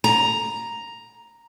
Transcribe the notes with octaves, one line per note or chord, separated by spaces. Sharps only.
A#5